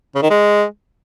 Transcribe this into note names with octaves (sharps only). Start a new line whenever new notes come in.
C#3
D#3
G#3